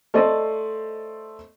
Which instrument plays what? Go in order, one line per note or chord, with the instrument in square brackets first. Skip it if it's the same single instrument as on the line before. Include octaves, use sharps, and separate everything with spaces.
[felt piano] A3 A4 C5 D5 D#5